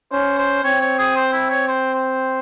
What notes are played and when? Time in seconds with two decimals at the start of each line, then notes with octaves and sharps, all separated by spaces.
0.12 C#4 C5
0.38 C5
0.64 C4 C#5
0.81 C#5
0.98 G#4
1.16 C5
1.33 E4
1.50 C#5
1.68 C5
1.94 C5